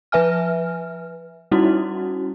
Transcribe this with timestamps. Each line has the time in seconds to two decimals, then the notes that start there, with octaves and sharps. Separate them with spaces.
0.12 F3 B4 E5 G#5 F6
1.51 G3 C#4 D#4 E4 F#4